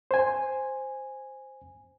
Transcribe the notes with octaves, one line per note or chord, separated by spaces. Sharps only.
C5 G#5